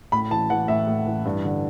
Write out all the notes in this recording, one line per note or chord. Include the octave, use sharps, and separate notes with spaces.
A2 B5
E3 A5
E3 F#5
A2 E5
A2
E3
G2
D3